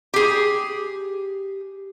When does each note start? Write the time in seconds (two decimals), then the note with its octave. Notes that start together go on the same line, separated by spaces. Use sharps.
0.14 G4 G#4